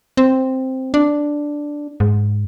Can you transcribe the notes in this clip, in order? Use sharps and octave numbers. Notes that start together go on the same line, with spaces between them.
C4
D4
G#2